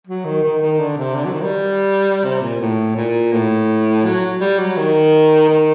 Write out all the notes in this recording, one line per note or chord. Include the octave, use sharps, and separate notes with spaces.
F#3
D#3
D#3
D#3
D3
C3
D3
F#3
D#3
G3
C3
A#2
A2
A#2
A2
F#3
G3
F#3
D#3
D#3